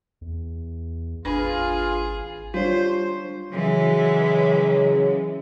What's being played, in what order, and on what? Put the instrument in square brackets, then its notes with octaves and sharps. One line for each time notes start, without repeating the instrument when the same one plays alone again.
[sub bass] E2
[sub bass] G#1 [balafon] D4 B4 B5 [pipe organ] F4 [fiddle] G#4
[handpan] G3 D4 C#5 [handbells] F4 [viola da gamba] C5
[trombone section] C#3 F#3 [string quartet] E3 G#3